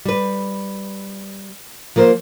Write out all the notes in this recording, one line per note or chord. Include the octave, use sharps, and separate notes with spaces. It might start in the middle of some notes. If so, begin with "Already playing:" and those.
G3 B4
F3 A#3 A#4 C5